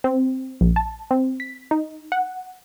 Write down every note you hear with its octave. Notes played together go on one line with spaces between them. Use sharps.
C4
A#1
A5
C4
B6
D#4
F#5